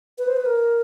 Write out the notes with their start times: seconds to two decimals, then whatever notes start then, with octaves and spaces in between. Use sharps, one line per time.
0.18 B4
0.27 C5
0.36 B4
0.45 A#4